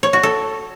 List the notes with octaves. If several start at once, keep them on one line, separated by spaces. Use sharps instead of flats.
C#5
F#4
A4